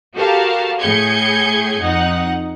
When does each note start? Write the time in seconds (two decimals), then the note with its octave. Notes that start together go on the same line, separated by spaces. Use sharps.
0.14 F#4 G4 A4 A#4 F5 A5
0.80 A2 G#4 G#5 G6 G#6 C#7
1.80 F2 D#4 F#5